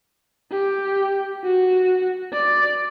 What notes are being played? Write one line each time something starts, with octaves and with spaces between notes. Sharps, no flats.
G4
F#4
D5